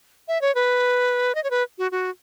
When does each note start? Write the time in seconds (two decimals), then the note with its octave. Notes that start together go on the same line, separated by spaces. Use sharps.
0.28 E5
0.42 C#5
0.55 B4
1.35 D#5
1.44 C#5
1.51 B4
1.78 F#4
1.92 F#4